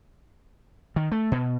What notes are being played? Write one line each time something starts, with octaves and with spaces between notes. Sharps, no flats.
D#3
A3
B2